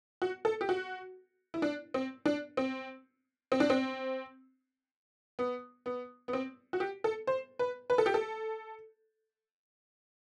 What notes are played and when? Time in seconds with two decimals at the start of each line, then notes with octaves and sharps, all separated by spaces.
0.22 F#4
0.45 A4
0.61 G4
0.69 F#4
1.54 E4
1.62 D4
1.94 C4
2.26 D4
2.57 C4
3.52 C4
3.60 D4
3.70 C4
5.39 B3
5.86 B3
6.28 B3
6.33 C4
6.73 F#4
6.80 G4
7.04 A4
7.27 C5
7.59 B4
7.90 B4
7.98 A4
8.06 G4
8.14 A4